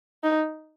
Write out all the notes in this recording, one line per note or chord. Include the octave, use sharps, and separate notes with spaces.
D#4